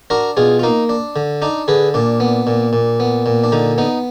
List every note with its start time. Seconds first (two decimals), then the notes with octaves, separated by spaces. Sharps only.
0.10 D4 F#4 A#4
0.37 B2 F4 G#4
0.59 F4
0.63 A#3 D#4
0.89 D4
1.16 D3
1.42 D4 D#4
1.68 D3 G#4 B4
1.94 A#2 D4
2.20 B3
2.47 A#2
2.73 A#2
3.00 B3
3.26 A#2
3.44 D4
3.52 D3 D#4
3.78 B3 D#4